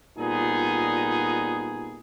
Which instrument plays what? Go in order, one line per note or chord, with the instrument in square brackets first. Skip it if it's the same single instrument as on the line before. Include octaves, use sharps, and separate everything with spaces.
[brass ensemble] A#2 G3 B3 D#4 F4 G#4